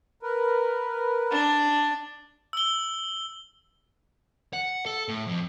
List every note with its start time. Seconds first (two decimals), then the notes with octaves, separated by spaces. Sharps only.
0.23 A#4 B4
1.31 D4
2.53 E6 G7
4.53 F#5
4.86 A4
5.08 A2
5.27 F2